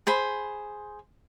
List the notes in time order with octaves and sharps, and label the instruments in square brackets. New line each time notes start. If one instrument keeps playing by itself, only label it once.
[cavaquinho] G#4 C5 B5